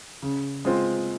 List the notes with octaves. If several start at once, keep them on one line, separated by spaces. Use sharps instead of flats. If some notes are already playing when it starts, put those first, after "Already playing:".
C#3
G#3 C4 F4 C5